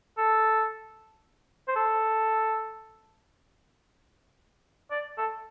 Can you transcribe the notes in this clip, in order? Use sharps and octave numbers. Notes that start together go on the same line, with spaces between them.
A4
C5
A4
D5
A4